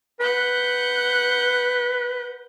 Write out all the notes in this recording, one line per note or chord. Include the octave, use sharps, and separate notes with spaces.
B4 F#5 F#6 G6